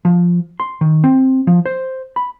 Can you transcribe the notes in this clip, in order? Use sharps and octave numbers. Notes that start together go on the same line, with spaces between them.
F3
C6
D#3
C4
F3
C5
B5